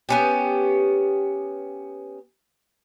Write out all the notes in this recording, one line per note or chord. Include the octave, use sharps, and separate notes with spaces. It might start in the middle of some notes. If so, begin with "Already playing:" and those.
B3 C#4 G4